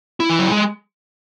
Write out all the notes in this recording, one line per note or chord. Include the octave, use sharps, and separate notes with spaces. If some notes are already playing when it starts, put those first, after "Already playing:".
E4
E3
F#3
G#3